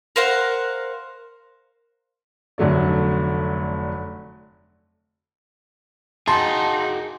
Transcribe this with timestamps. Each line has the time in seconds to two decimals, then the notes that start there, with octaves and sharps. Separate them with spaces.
0.16 A#4 C5 F5 F#5
2.58 F1 D3 F#3 A3 D5
6.27 D#4 F#4 G#4 A5 C6